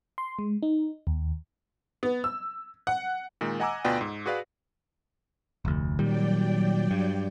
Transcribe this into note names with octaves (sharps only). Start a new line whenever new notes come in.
C6
G#3
D#4
D#2
B3
E6
F#5
A#2 D#3 G#3
D#5 F#5 G#5 A#5 D6 E6
D2 B2 F4 B4 D5 G5
G#2
F#4 G#4 B4 D5 F5
F1 D2
A#2 D#3 F#3 G3 D5 G5
G2